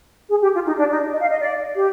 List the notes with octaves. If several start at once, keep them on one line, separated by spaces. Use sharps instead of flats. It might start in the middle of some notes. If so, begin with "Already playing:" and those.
G#4
G4
F4
D#4
D4
D#4
D#5
F5
D#5
D5
G4